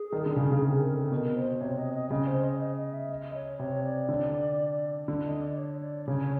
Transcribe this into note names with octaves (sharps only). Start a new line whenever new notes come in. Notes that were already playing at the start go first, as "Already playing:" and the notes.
Already playing: G#4
D#3
D3
C#3
C#3
C3
A#4
A4
B2 A#4
C5
C3 C#5
D#5
D#5
C#3 D#5
C5
D#5
D#5
D#5
E5
D#5
C#5
C3 C#5
D5
D3
D3
D#5
D5
C#5
D5
C#3 C#5